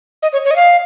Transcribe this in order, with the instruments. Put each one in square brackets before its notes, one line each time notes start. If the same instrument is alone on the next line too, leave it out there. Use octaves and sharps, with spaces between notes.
[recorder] D#5
C#5
C#5
D#5
F5